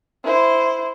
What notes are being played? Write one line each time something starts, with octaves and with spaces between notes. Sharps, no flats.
E4 C5